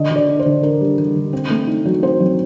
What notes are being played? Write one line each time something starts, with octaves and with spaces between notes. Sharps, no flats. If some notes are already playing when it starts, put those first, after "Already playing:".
Already playing: D3 D#5
D3
D5
D4
C5
D3
D4 A#4
G3
G3
D3
C4
A3
D#4
F#3
C4 C5
F#3